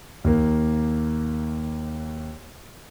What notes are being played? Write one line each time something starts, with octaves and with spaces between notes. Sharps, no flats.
D#2 A#3